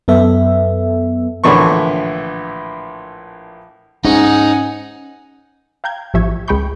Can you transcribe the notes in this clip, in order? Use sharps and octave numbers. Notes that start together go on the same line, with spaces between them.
F#2 B3 A4 E5
A#1 A2 D3 E3 D5 C#6
G#2 C#4 D#4 F#5 G#5
F5 G5 A#5 G6 G#6
A1 F3 G4 E5 C#6 G#6
C#2 G#3 G5 B5 C#6 G6